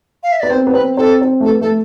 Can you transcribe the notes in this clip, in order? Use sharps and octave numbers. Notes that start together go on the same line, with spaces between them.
F5
E5
B3 D5
C4 C5
B3
C4 B4
C4 A4
C4
A3
B3 A4
A3 A4